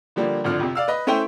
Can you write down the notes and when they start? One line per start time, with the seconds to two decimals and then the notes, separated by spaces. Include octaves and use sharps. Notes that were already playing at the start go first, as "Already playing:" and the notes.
0.16 D3 F3 G3 A#3
0.44 G#1 D3 F3 F6
0.60 F2 C3
0.75 D5 F5 E6
0.88 B4 D#5
1.07 A3 C#4 E4 C5 G5